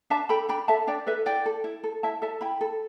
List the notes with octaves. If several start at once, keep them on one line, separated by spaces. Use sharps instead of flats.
D4 E5 A5
A4 G5 B5
D4 G5 B5
A4 E5 A5
D4 D5 G5
A4 B4 E5
E4 D5 G5
A4
E4
A4
E4 E5 A5
A4 E5 A5
E4 G5 B5
A4